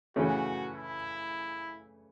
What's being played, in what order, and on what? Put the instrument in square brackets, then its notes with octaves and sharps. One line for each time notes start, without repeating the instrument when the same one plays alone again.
[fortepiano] C#3 E3 A3 C#4 [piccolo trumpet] F#4
[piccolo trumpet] E4